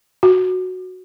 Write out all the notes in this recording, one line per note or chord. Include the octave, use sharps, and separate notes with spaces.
F#4